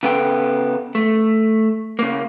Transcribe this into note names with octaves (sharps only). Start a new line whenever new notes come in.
C#3 B3 A4 G5
A3
C#3 A#3